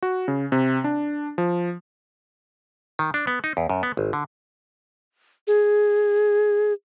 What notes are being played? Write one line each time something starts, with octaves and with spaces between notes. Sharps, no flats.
F#4
C#3
C3
D4
F3
D#3
D4
B3
D#4
E2
F#2
B3
G#1
D3
G#4